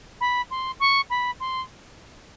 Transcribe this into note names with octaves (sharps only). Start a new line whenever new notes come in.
B5
C6
C#6
B5
C6